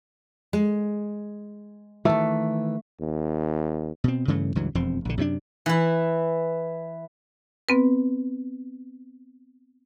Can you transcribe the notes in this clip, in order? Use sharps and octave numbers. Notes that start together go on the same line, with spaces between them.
G#3
D#3 E3 A3
D#2
B2 C4
G2 C#3 E3 A3
C#2 G2 E3 F#3
E1 F2 F3 C4
A#1 D3
F#2 C3 G#3 D4
E3 E4
B3 C4 B4